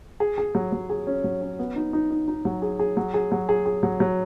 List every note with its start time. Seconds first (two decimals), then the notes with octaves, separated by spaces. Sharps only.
0.20 G#4
0.38 G#4
0.55 F#3
0.72 F#3
0.90 G#4
1.07 C#4
1.24 F#3
1.41 C#4
1.59 B3
1.76 D#4
1.93 D#4
2.11 D#4
2.28 D#4
2.45 F#3
2.62 G#4
2.80 G#4
2.97 F#3
3.14 G#4
3.32 F#3
3.49 G#4
3.66 G#4
3.83 F#3
4.00 F#3